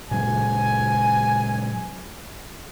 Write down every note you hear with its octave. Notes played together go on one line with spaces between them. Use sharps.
A#2 F#3 G#3 G#5